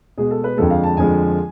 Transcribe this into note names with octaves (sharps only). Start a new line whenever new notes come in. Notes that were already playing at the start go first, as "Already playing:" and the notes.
B2 G#3 G#4
A4
B4
F2 D3 F3 G#3 A4
F5
A5
F2 D3 F3 G#3 G#5